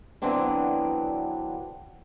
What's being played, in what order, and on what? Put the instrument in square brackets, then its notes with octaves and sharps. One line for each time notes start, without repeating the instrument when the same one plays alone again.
[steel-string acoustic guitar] D3 E3 F#3 B3 C4 D4